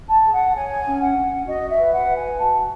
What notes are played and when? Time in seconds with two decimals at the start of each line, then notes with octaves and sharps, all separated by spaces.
0.09 A5
0.24 G#4
0.31 F#5
0.54 C#5 G#5
0.84 C#4
1.00 F#5
1.15 C#4
1.45 F#4 D#5
1.69 E5
1.77 B4
1.92 F#5
2.07 B4
2.15 G#5
2.38 F#4 A5